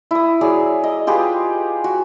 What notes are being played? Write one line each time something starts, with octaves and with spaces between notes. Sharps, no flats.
E4 D#6
F#3 G#4 D5
D#5
F4 G4 G#4 B4
F#4